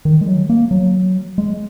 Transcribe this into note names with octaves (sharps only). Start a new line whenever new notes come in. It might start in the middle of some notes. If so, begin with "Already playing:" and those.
D#3
G#3
F#3
A#3
F#3
G#3